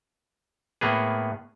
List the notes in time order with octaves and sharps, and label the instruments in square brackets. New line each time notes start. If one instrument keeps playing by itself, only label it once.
[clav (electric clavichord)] A2 A#3 B3 G#4